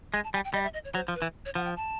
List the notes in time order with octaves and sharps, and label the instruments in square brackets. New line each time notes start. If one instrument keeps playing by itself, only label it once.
[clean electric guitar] G#3 [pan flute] G#5
[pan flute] A5
[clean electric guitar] G3 [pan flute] G#5
[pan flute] G5
[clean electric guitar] G3 [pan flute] D#5
[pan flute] E5
D#5
C#5
[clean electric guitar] F#3 [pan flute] C5
[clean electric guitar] F3
[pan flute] B4
[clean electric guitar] E3
[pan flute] C#5
[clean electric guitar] F3 [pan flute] F#5
[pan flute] G5
A5